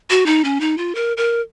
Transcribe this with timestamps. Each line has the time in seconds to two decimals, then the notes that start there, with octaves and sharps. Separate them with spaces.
0.10 F#4
0.26 D#4
0.44 C#4
0.60 D#4
0.78 F4
0.95 A#4
1.17 A#4